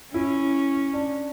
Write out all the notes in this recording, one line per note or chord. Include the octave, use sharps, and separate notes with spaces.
C#4 E4
D4